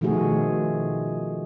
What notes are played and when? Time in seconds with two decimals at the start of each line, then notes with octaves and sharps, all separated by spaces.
0.01 B2 D#3 F3 A3 F#4 G#4